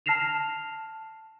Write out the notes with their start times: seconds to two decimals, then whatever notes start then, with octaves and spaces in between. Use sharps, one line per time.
0.06 A5 F6 A#6 C7 E7 F7